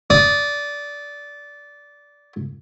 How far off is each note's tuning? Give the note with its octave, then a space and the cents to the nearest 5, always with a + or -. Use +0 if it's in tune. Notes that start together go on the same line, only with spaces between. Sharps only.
D5 -15 D#6 +0